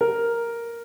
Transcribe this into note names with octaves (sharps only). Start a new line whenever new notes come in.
A#4